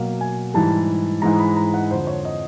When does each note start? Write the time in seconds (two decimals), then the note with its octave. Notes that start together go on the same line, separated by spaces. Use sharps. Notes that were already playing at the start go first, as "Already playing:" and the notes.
Already playing: B2 F#3 A#3 F5
0.21 G#5
0.54 G#2 E3 G3 A5
1.22 G#2 E3 G#3 A#5
1.39 B5
1.56 A#5
1.74 F#5
1.90 F2 D3 F3 C5
2.07 C#5
2.25 D#5